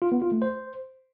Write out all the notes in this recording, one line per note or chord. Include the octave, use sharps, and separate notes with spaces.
F4
B3
F4
A3
C5